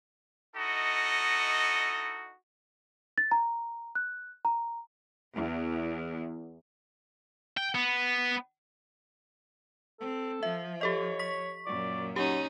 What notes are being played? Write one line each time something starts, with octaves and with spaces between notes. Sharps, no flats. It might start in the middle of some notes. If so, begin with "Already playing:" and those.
D#4 E4 F#4 A4 D#5
A6
A#5
F#6
A#5
E2
G5
B3
C4 A4
F3 E5
G4 A4 C#5 D#5
C#6 B6
F#2 A#2 D5
F#3 C#4 D#4 G4